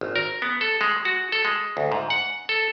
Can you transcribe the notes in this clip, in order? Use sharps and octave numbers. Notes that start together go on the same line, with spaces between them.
G#1
A#4
B3
A4
G#3
F#4
A4
G#3
D2
G#2
F#5
A4